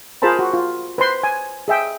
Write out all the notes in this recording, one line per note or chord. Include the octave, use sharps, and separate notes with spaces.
F4 G#4 A#4 C5 A5 B5
F#4
F4
B4 C5 C6
G#5
G#4 E5 G5